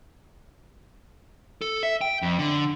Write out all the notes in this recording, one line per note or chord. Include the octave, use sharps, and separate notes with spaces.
A4
E5
G5
F2
D3